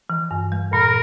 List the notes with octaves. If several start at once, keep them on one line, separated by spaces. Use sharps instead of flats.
E3
G2
G3
A#2 A#4